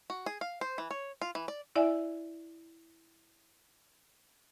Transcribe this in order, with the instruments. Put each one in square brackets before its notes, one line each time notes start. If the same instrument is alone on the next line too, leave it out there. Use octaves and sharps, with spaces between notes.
[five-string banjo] F#4
G#4
F5
C5
E3
C#5
F4
E3
D5
[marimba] E4 D5 E5 G#5